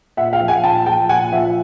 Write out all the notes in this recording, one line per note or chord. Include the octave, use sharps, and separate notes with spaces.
A#2 E5 F#5
F5 G5
F3
F#5 G#5
A#2 G5 A5
F3 G5 A5
A#2 F#5 G#5
F3 E5 F#5